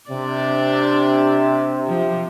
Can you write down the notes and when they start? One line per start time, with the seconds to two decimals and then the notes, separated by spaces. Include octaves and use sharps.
0.10 C3 D4 D5
1.87 F3